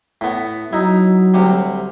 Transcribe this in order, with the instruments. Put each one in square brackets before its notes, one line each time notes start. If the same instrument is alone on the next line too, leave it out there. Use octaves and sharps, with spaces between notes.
[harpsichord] A2 B3
[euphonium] F#3 [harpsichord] D#4 E4
[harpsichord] D2 C3 G3